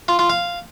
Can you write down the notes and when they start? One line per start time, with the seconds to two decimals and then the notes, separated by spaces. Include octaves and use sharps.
0.08 F4
0.19 F4
0.30 F5